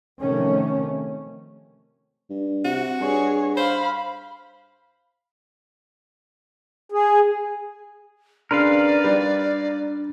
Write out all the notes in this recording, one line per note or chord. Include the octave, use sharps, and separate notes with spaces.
C3 D#3 F3 A3 C#4
G2
C3 F#4
G2 G#4 C#5
C5 F5 B5
G#4
C#3 D4 A#4 B4 D5 F5 C6
G3